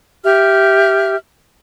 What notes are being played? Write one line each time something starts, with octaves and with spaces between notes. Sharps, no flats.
G4 E5 F6